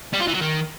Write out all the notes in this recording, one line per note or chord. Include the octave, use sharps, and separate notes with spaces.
G3
F4
E3
F#3
D#3